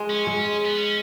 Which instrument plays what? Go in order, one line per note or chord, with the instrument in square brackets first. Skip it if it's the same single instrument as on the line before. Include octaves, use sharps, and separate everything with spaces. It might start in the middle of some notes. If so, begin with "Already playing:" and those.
Already playing: [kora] G#3
[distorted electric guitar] C#4
[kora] G#3
[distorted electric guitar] B3
C#4